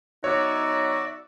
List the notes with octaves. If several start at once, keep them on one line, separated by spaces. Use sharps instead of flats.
F#3 B3 D#4 F#4 C#5 D5 E5